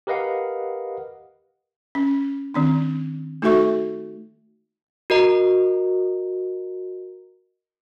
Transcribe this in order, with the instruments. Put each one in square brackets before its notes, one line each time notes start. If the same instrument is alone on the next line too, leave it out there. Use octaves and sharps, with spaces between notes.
[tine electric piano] G4 A#4 B4 D#5 F5 F#5
[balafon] C#4
D#3 C4 D4
A3 D#4 F#4 A4 E5 C#6
[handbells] F#4 A#4 D#5 A#5